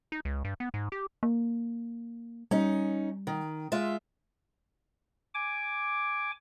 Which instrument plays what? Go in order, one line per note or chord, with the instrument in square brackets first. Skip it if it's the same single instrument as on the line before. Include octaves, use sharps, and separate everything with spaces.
[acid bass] D#4
C#2
G2
B3
G#2
G4
[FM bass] A#3
[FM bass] G3 [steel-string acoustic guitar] C#4 D#4
[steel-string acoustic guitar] D#3
G#3 F4 E5
[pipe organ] G#5 D6